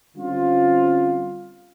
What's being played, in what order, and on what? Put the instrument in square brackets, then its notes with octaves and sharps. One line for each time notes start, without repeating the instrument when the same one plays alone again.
[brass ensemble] D3 G3 C4 C#4 F4